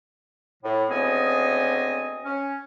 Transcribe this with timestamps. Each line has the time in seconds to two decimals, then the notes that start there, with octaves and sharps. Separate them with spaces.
0.63 A2
0.90 D2 C#3 B3 C4 D#5 G#5
2.24 C#4